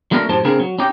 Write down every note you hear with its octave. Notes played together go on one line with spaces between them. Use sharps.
F#3 A3 A#3 D4 F#4 A#4
F#2 A2 G4 C5 A5
C#3 A#3 C4 D4 G#4 A#4
F#3
C#4 D#4 G4